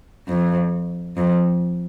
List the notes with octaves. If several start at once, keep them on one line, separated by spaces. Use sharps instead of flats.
F2
F2